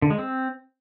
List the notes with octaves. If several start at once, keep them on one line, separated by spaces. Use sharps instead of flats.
D3
G#3
C4